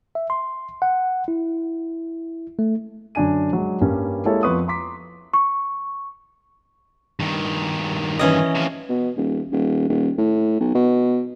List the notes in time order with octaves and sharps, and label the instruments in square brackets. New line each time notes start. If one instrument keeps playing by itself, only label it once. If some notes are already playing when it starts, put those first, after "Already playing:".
[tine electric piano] E5
C6
F#5
E4
A3
[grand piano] F#2 D3 D4 G#5 D#7
F#3 G#3
G2 G3 A#3 C#4
G#3 A#3 E4 G4 A4 C#5
F2 B3 B4 C6 C#6 D#6
A#5 C6 D6 B6
[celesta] C#6
[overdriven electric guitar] G2 D#3
[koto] E3 C#4 D#5
[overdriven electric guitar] C3 F3
[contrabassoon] B2
D#1
D#1
D#1
A2
B1
B2